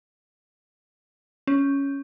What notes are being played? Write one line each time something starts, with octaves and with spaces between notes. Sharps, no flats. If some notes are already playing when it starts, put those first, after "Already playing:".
C#4